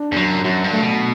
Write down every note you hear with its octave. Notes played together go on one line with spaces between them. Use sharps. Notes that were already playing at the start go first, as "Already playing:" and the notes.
Already playing: D4
E2
F#2 F#3
F#2 F#4
G2
A3
B2